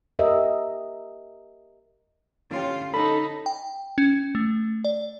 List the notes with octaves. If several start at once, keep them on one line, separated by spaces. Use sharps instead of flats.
G4 A#4 D#5 E5
D3 C#4 F4 G4
D#4 A4 B5
G5
C#4
A3
D5